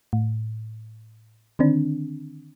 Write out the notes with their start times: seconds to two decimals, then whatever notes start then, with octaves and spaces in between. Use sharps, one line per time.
0.13 A2
1.59 D3 D#3 C4 D4